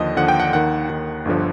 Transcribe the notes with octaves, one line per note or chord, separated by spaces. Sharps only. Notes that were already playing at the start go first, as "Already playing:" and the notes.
Already playing: D#2 D3 F3 D#5
D#2 D3 F3 F#5
G5
F#5
D#2 D#3 F#5
D#2 D#3
G1 G2 D3 F3